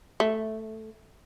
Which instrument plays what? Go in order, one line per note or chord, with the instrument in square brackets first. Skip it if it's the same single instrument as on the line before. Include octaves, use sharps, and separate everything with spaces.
[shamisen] A3